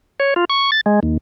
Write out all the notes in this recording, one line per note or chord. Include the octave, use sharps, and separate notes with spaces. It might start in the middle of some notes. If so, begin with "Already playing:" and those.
C#5
F4
C#6
A6
G#3
D#2